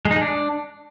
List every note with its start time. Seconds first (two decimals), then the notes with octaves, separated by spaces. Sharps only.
0.05 G#3
0.11 D#4
0.16 G#3
0.21 D4